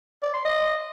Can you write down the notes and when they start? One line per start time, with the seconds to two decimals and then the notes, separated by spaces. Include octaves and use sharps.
0.23 D5
0.34 C6
0.45 D#5